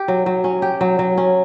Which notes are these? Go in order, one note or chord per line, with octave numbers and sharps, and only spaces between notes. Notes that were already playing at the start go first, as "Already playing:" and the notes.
Already playing: G4
F#3
F#3
C#4
G4
F#3
F#3
C#4